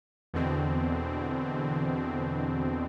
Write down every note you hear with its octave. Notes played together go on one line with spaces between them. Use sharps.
E2 B2 D3 C4